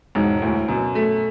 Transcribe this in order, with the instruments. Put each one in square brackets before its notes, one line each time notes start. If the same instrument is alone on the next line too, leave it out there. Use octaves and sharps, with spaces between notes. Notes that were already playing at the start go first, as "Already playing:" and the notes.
[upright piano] E1 [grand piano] G#2
[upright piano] D2 [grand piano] A2
[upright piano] F#2 [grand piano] B2
[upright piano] A3